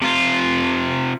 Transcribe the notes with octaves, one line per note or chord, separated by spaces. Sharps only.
C3 F4